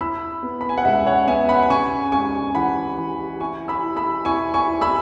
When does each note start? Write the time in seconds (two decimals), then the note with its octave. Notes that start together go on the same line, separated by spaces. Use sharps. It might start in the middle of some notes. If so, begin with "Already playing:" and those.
0.01 E4 B5 E6
0.43 B3
0.61 B5
0.69 G#5
0.78 F#5
0.85 C#2 E5
1.06 C#5 F#5
1.28 B3 E5 G#5
1.49 F#5 B5
1.70 C#3 G#5 C#6
2.12 C#2 G#5 C#6
2.55 E3 F#5 B5
2.97 E3
3.40 E4 G#5 C#6
3.68 B5 E6
3.83 E4
3.96 B5 E6
4.25 E4 G#5 C#6
4.54 G#5 C#6
4.67 E4
4.81 B5 E6